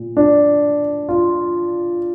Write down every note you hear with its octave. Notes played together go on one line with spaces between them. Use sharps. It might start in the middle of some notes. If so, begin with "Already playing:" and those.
Already playing: A#2
D4
F4